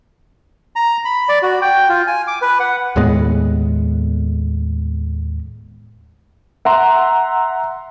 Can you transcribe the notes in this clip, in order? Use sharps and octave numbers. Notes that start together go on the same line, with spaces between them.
A#5
B5
D5
F#4
G5
F4
G#5
D6
B4
F#5
D#2 A2 G#3 B3
E5 F#5 A#5 C6